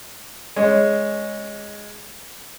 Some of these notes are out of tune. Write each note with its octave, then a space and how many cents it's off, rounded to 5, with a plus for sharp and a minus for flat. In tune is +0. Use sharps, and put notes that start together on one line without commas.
G#3 +0 C#4 +0